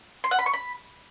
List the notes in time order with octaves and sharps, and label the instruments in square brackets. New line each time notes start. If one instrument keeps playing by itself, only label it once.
[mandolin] C6
F#5
B5
C#6
B5